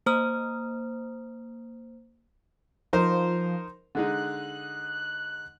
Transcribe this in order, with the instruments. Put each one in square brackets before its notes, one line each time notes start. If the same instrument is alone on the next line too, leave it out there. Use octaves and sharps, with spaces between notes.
[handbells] A#3 C5 A#5 D#6 F6
[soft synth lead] F3 [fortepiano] D#4 A#4 C5
[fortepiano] D3 G#3 D#4 [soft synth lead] F#6